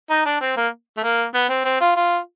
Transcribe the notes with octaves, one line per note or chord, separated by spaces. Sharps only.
D#4
D4
C4
A#3
A3
A#3
B3
C4
C4
F4
F4